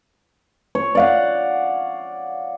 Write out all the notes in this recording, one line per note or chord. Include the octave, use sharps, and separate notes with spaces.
C#5
D5 F5 F#5